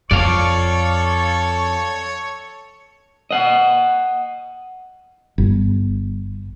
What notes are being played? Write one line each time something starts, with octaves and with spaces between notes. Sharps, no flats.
F2 A4 C#5 D5 F5 C#6
D#5 F#5
G1